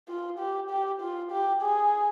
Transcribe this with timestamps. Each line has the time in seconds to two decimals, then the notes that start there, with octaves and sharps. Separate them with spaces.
0.08 F4
0.38 G4
0.70 G4
1.01 F4
1.31 G4
1.62 G#4